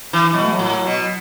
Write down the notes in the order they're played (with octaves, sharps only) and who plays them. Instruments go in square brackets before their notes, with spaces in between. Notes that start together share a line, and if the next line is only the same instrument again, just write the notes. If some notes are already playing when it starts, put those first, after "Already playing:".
[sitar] E3
[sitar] B2 [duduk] F#3
[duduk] A3
F#3
[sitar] A2
B2